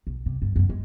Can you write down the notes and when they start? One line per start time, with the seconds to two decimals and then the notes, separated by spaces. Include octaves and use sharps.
0.07 B1
0.26 C3
0.42 G2
0.56 F#2 A3
0.69 G#3